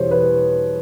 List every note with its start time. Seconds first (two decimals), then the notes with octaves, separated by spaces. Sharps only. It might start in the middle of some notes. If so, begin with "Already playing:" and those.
Already playing: E2 B2 G3 C5 C#5
0.11 B4